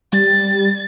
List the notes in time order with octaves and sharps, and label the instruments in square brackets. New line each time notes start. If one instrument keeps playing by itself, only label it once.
[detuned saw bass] G3 [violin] A6